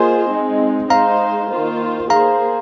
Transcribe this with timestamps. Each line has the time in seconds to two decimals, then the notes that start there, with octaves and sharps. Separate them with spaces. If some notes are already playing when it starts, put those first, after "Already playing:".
Already playing: A#3 F4 G#4 C5 D#5 G#5
0.31 G#3 C4 D#4
0.90 G#3 D#4 C5 F5 A#5
1.51 D#3 A#3 F4 C5
2.10 A#3 G#4 C5 F5 A#5